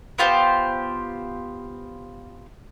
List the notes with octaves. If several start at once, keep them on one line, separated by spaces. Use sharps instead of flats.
B3 F4 G4 C5